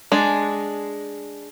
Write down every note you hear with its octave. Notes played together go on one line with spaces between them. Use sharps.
G#3 D4